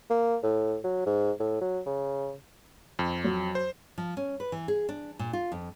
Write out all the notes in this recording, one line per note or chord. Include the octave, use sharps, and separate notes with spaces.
A#3
A2
F#3
G#2
A2
F#3
C#3
F2
F#3
C5
F3
C#4
B4
E3
G#4
D4
A#2
F4
F2